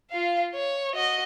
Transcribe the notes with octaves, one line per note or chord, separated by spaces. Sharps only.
F4 F5
C#5
F#4 D#5